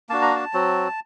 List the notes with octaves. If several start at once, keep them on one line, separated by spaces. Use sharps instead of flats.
A#3 D4 F#4 A5
A#5
A5
F#3 C4 F#4